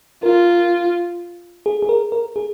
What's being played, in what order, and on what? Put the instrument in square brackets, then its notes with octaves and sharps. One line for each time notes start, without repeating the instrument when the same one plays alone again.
[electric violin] F4 [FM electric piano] A#4
[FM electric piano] G#4
G#4
A#4
A#4
G#4